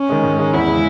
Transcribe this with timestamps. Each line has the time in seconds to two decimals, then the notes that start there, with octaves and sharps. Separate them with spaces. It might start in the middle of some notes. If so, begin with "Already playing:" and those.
Already playing: C#4
0.09 D#3 G#3
0.23 G#2
0.38 D#3 G#3
0.54 E2 E4
0.68 C#3 G#3